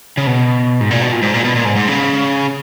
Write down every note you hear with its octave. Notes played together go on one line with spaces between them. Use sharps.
C#3
B2
G#2
A#2
B2
A#2
G#2
A#2
B2
A#2
G#2
G#2
C#3